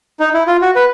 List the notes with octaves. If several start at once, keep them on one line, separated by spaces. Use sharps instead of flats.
D#4
E4
F4
F#4
B4